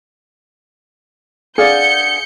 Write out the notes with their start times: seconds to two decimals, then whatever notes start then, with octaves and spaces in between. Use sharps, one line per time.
1.58 D4 G#4 D5 F5 F#5 G6 C#7